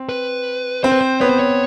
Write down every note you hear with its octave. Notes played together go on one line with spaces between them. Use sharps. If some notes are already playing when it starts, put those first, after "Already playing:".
Already playing: C4
B4
C4 C5
B4
C5
B3 C#5
C5
C#5